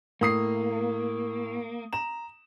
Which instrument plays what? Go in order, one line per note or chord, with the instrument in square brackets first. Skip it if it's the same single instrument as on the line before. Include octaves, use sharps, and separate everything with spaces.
[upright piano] A2 D#6 C7 [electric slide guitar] A#3
[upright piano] A#5 E7